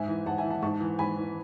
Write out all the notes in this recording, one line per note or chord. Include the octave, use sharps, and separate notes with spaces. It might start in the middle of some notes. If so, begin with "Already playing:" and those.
Already playing: G#2 E5 G#5
E3
G#2 F#5 A5
E5 G#5
E3
F#5 A5
G#2 A5 C#6
E3
G#2 G#5 B5
E3